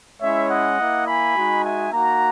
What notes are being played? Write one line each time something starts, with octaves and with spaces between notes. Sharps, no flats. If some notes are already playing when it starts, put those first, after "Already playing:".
G#3 C#4 E4 C#5 E5
D#5 F#5
A#3 E4
G#5 B5
G#3 D#4 F#4
E5 G#5
A#3 D#4 F#4 F#5 A#5